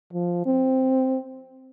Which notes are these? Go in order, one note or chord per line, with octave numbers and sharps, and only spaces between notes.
F3
C4